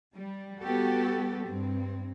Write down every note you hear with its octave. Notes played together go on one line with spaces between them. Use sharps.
G3
G3 B3 F#4 G4 A4
G2 C4